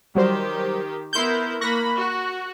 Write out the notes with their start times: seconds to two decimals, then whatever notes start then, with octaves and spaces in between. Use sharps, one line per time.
0.15 D#3 F#3 G3 G4 C5
1.13 B3 E4 A#4 C6 G6
1.61 A#3 B5 C#6 F#6 A#6
1.95 F#4